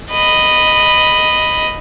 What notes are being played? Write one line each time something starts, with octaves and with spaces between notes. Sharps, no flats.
D#5 B5